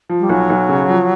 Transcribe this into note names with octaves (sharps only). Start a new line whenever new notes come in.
F3
G3
B1 F#3
B1
C#3
F3